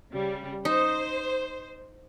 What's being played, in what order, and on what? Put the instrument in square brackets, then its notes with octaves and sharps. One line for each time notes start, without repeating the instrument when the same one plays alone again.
[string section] C#3 G3
[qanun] D#4 [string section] C5